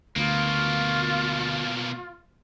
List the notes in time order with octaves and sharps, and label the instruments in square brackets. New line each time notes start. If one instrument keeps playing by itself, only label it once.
[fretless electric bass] D2 [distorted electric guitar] B2 A#3 [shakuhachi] F4